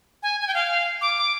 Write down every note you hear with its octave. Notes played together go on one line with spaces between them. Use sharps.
G#5
G#5
G5
F5
D6